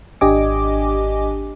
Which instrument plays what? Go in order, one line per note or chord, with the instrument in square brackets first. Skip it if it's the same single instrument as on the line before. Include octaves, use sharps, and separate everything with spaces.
[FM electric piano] G#1 D4 G4 D#5 G#5 D6